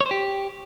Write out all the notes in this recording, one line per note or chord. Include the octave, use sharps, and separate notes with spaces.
C#5
C5
G4